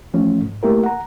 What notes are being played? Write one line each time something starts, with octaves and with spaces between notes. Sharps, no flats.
E3 F3 A3 C#4
G#2
A3 A#3 E4 G4 A#4
F#5 A#5